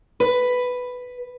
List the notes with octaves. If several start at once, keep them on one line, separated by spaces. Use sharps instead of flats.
B4